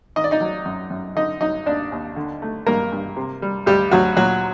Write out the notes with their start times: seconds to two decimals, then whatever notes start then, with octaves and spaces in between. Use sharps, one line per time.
0.16 D#3 D#5
0.24 D5
0.31 D#4 D#5
0.41 F#3
0.65 F#2
0.90 F#2
1.15 D3 D#4 D#5
1.41 F#3 D#4 D#5
1.66 D#2 D4 D5
1.92 D#2
2.16 D3
2.42 A3
2.66 G2 A#3 A#4
2.92 G2
3.17 C3
3.42 G3
3.66 D2 G3 G4
3.91 D2 F#3 F#4
4.17 A#2 F#3 F#4